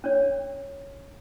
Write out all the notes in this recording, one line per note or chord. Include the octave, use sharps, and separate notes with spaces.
C#4 D4 C#5